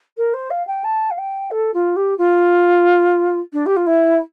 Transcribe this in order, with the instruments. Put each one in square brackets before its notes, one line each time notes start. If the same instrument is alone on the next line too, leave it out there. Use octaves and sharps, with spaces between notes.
[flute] A#4
C5
F5
G5
A5
F5
G5
A4
F4
G4
F4
D4
G4
F4
E4